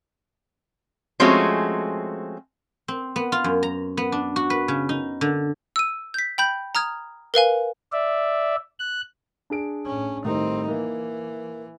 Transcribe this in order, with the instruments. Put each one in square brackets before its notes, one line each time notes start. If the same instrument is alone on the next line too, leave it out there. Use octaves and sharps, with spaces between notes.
[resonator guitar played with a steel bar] F3 G#3 A3 C4 C#4 F#4
[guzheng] C4
B3
F4
F#2
A#5
B3
D4
F#4
B4
C#3
D#4
D3
[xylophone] E6 D#7
G6 B6
G5 B5 G6
A#5 D#6 F6 G#6
A#4 B4 F5 G#5
[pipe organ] D5 E5
F#6
[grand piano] D4 G#4 D7
[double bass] A2 C#4
[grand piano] A2 D#3 G3 [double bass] C4 D#4
[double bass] E3 [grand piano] A#3